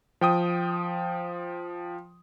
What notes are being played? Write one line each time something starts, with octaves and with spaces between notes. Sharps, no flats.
F3 G5 D#6